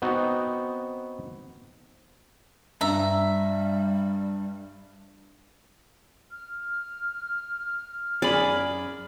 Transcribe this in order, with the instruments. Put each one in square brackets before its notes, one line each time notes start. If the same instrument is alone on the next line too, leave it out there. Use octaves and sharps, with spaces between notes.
[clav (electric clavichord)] B3 C4 D#4 F#4
[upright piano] G2 [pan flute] G3 [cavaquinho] E5 A#5
[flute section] F6
[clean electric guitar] F#2 B5 [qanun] G#4 D5